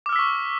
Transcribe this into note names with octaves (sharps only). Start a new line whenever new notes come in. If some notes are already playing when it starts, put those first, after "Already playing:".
C#6 D6 E6 F6 B6